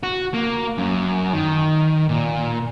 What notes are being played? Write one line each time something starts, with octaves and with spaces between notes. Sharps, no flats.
F#4
A#3
F#2
D#3
A#2